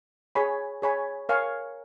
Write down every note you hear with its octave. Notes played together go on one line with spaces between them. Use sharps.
G#4 C#5 G#5 B5
G#4 C#5 G#5 B5
A#4 C#5 F5 G#5 C#6